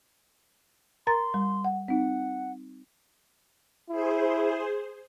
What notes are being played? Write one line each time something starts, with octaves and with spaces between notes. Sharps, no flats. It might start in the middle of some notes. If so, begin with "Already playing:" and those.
A#4 A#5 C6 A6
G3
F#5
C4 D#4 F#5
E4 G#4 C5